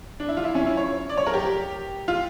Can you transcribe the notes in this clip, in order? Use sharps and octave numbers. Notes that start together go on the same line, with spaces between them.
D4
E4
F4
E4
C#4
E4
C#5
D5
C#5
A#4
G4
F4